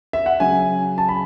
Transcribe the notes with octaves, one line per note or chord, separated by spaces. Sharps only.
E5
F#5
C#3 F#3 G#5
A5
B5